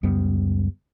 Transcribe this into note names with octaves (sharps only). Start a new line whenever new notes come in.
C#2 F#2 G3 B3